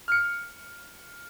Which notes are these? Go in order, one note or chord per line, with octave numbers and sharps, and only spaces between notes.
F6 C#7